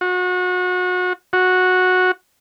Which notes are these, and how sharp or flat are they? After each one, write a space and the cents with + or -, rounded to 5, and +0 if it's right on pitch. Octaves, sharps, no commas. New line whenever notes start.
F#4 -30
F#4 -10